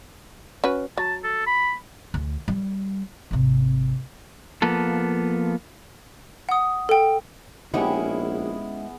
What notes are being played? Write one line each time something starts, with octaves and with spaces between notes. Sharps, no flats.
C#4 F#4 B4
F#3 A5
A4
B5
D2
G3
G#1 C3
F3 A#3 B3 A4
F#5 D#6
A4 G5
A#1 G#3 B3 C#4 D#4 E4 G4 G#4